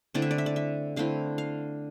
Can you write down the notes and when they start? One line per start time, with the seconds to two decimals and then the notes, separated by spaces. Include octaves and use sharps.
0.14 D3 A3 C4 E4 D5
0.22 E5
0.31 D5
0.38 E5
0.46 D5
0.56 E5
0.96 D3 A3 C4 E4 F5
1.38 F5